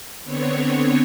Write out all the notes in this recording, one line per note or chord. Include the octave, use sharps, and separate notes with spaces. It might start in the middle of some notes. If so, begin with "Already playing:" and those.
D3 B3 C4 C#5